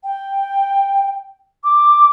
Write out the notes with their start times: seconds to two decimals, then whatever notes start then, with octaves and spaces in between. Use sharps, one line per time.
0.03 G5
1.64 D6